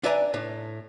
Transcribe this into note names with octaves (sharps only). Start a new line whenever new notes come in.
D4 B4 D5 E5 G#5 A#5
A2 D4